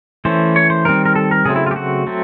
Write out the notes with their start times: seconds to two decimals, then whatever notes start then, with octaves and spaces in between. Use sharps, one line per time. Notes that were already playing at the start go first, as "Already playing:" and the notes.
0.25 E3 A3 C#4 C5
0.56 C#5
0.70 C5
0.85 D#3 G3 C4 A#4
1.05 A#4
1.15 A4
1.31 A#4
1.45 C#3 F#3 A3 C4 G#4
1.56 E4
1.66 F4
1.71 G4
1.76 F#4
2.07 F#3 A3 C4